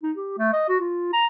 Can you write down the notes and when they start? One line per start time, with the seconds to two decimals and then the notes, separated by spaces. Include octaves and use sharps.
0.03 D#4
0.17 G4
0.38 A3
0.53 D#5
0.69 F#4
0.80 F4
1.13 A#5